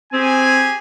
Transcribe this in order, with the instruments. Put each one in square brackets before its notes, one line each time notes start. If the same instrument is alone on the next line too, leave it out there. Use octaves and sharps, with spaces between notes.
[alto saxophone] C4 [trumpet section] G4 G#4 G#5